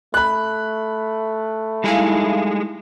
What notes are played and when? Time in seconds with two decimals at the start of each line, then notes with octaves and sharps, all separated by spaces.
0.14 A3 B5 F#6
1.84 G3 G#3 D#4 E4 G#4 F5